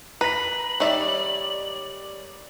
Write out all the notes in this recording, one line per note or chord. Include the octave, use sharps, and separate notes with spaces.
B4 A#5 B6 F#7
D#3 G3 C#5 D5 E5